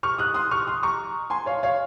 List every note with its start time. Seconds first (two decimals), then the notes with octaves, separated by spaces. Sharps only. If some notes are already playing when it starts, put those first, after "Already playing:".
0.03 C#6 F6
0.18 D#6 F#6
0.34 C6 D#6
0.51 C#6 F6
0.67 C6 D#6
0.83 A#5 C#6
1.30 G#5 C6
1.46 C#5 F5
1.63 C#5 F5